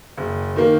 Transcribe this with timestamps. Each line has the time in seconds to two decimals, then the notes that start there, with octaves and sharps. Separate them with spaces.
0.18 F#1
0.56 D#3 A#3